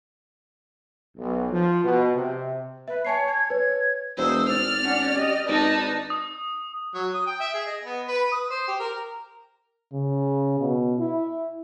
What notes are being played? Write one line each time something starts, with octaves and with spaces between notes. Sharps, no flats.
B1
F3
B2
C3
B4 E5
C#5 G#5 A5 C7
G#6
B4 C#5
E1 C5 D#6 E6
G#1 D5 F6
C#4 D4 F#5
G4 D#5
G#1 D#4 B4 D5 A5
D#6
F#3
D#6
G5
E5
G#4
D#5
B3
B4
D#6
C5
G4
A#4
C#3
B2
E4